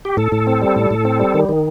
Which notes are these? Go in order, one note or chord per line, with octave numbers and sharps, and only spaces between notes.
G4
A2 A4
A2
C4
G3
A2
A2
C4
G3
D#3
D#3